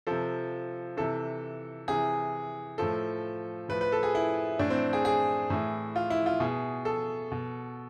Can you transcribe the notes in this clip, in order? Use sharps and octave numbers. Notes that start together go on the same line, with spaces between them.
C3 F3 A4
C3 E3 A4
C3 E3 G#4
A2 F3 A4
A2 F3 B4
B4
A4
G#4
E4
A2 E3 D4
C4
G#4
G#4
A2 E3
F4
E4
F4
B2 G#4
A4
B2